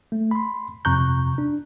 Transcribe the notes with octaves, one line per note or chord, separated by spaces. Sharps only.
A3
B5 C6
F2 C3 A#5 C#6 F#6 G6
D4